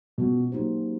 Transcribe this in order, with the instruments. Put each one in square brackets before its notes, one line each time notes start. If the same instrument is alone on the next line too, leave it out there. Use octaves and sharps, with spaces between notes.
[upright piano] B2 [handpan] F3 G#3 C#4 F#4
[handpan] F#3 A#3 D#4 G4 C5